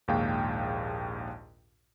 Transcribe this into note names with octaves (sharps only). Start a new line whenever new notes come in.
A#1 D#2 G#2 G#4 F5 G5